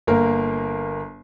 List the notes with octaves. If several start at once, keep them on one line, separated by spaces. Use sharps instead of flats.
G1 A#3 A#4